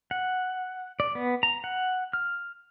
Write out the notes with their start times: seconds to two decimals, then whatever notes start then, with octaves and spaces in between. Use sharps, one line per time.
0.11 F#5
1.00 D5
1.15 B3
1.43 A#5
1.64 F#5
2.13 F6